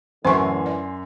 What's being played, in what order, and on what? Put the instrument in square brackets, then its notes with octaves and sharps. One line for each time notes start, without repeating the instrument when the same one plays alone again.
[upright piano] F#2 [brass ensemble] A2 D3 E3 [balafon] C5 C#6 [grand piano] G#5 C6
[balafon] D5